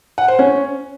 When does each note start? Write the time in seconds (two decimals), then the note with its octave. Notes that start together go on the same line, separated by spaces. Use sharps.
0.18 F#5
0.28 C5
0.39 C#4